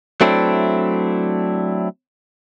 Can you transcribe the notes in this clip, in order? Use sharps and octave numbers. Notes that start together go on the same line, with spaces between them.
F#3 A3 C4 D4 E4